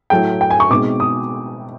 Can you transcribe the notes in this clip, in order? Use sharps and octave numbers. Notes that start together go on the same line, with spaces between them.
A2 F#3 A3 G5
G5
G#5
C#6
B2 G#3 C4 D#4 D6
D#6